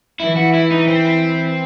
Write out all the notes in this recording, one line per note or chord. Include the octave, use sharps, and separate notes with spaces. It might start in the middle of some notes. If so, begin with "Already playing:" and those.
E3 E4
F#4
E4
D#4
C4